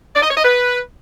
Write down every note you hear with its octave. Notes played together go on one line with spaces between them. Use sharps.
D5
D#5
C#5
D#5
B4